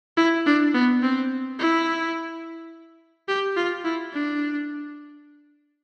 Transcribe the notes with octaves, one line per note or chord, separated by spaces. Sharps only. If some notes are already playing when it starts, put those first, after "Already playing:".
E4
D4
B3
C4
E4
G4
F4
E4
D4